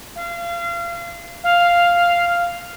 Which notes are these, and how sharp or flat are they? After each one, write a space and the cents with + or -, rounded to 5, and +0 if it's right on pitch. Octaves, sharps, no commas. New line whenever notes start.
F5 -30
F5 -5